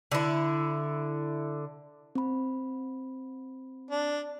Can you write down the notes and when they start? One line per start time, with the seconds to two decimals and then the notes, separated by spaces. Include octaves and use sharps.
0.11 D3 E4
2.15 C4 B5
3.91 D4